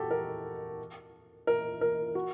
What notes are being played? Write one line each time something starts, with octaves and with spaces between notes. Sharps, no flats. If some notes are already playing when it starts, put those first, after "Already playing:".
Already playing: F#4 G4 A4
A#4
A#4
A#4
F#4